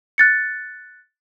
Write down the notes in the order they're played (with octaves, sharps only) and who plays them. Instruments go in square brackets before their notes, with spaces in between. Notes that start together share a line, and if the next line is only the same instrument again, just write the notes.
[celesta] F#6 A6 C#7